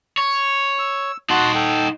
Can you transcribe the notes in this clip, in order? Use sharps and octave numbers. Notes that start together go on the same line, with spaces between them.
C#5
E6
D#4 F#4 F#5 A5 C6
A4 G5